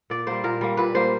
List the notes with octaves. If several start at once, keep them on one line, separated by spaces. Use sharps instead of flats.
A#2 D5
G3 A#3 C5
A#2 A#4
G3 A#3
A#2 B4
G3 A#3 C5